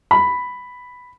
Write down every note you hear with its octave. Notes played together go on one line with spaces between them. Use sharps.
B5